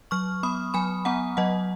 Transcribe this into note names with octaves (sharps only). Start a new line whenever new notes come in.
F#3 C#6 F6
B3 B5 D#6
F#3 G#5 B5
B3 F#5 A#5
F#3 D#5 F#5